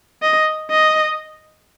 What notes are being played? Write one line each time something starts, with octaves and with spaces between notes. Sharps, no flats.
D#5
D#5